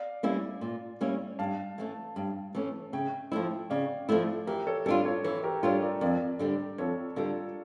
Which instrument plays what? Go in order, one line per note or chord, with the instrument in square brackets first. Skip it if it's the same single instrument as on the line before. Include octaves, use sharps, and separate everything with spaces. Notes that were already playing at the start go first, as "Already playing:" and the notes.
Already playing: [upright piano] D5 F5
[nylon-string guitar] G3 A#3 C#4 E4
A#2
G3 A#3 C#4 E4
[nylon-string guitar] G2 [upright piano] F5 A5
[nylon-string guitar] E3 A3 C#4
G2
E3 A3 C#4
[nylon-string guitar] C#3 [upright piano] E5 G5
[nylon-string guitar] F3 A3 E4
[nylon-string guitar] C#3 [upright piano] D5 F5
[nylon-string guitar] F3 A3 E4
[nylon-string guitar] E3 [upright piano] G4 A#4
[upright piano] A4 C#5
[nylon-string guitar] G3 D4 F4 [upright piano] A4 C#5
[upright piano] A4 C#5
[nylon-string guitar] E3 [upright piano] A4 C#5
[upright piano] G4 A#4
[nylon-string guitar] G3 D4 F4 [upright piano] A4 C#5
[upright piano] A#4 D5
[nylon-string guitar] F2 [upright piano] A#4 D5
[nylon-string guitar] D3 G3 D4
[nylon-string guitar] F2 [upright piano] A4 C#5
[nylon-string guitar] D3 G3 D4 [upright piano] F4 A4